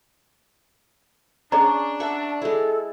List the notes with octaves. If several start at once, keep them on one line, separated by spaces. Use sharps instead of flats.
C#4 D4 G#4 D#5 A#5
E5 F#5 A5 C#6
G#3 E4 A4